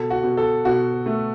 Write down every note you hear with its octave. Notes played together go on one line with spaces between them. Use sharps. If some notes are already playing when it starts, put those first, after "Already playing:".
Already playing: B2 A4
F#4
B2
A4
B2 F#4
A3